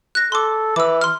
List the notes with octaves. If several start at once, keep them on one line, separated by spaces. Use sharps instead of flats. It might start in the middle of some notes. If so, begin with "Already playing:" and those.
F#6 A#6
A4 C6 D6
E3 D6 E6
C6 F6